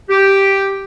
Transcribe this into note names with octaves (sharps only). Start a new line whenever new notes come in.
G4